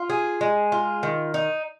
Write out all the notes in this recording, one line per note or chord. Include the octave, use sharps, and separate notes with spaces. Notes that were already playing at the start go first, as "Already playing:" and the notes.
Already playing: F4
G#4
G#3
F4
D#3
D#4